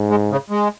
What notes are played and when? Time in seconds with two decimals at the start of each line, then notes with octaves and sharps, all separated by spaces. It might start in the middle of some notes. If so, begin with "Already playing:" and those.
Already playing: G#2
0.10 G#3
0.31 C#3
0.50 G#3